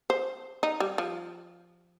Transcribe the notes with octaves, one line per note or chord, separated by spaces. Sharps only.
C5
D#4
G3
F3